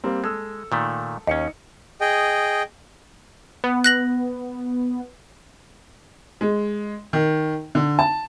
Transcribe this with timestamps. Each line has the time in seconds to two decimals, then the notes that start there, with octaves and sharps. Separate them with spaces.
0.04 G3 A#3 C4
0.24 G#3 A4 E6
0.72 A#2 D#3 A3
1.27 D#2 C#4 D#4 C#7
2.01 G#4 D#5 G5
3.64 B3
3.84 F#6 A#6 F#7
6.41 G#3
7.13 D#3
7.75 D3
7.99 A5